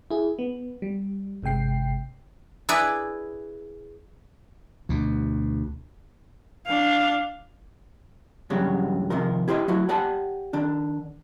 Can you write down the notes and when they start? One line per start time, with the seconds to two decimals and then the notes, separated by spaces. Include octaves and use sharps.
0.11 E4 G#4
0.39 B3
0.82 G3
1.43 G1 C3 G#3 G5 C7
2.69 E4 G#4 B4 D5
4.89 D2 B2
6.66 D4 F5
8.50 E2 G2 C#3 F#3 F#4 G4
9.10 C3 D#3 F3 A#4
9.48 E4 G4 C5 C#5 D#5
9.68 F#3 E4 F#4
9.89 G4 D5 F#5 G#5 A5
10.53 D#3 D4